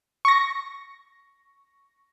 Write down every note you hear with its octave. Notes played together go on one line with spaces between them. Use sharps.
C#6 A#6